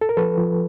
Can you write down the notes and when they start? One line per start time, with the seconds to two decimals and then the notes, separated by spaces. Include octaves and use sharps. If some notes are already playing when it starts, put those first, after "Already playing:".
0.01 A4
0.09 A#4
0.17 F3 A4 B4
0.38 F3